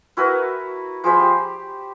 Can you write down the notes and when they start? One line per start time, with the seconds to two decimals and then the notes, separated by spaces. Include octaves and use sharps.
0.17 E4 F#4 A#4 B4
1.04 F3 G#4 C5 B5
1.20 G4